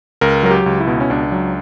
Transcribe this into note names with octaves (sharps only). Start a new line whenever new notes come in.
C#2 A#4
F#3 A#4
G4
C#2
E4
B2
C#4
C#2 D4
F#3